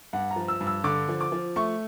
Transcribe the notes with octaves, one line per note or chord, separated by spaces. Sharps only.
G2 F#5
A#5
F3
E6
G2
E6
D3 D6
F3
D6
F3
A3 C#6